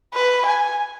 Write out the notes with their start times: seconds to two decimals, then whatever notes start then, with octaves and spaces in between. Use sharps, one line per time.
0.14 B4
0.46 G#5